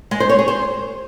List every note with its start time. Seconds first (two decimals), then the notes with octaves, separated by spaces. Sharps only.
0.11 G#3
0.20 C5
0.29 C#5
0.39 G#4
0.48 C5